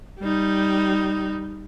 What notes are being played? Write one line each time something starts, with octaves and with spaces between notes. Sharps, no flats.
G3 D#4